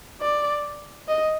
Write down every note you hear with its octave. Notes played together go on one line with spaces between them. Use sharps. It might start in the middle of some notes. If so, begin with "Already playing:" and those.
D5
D#5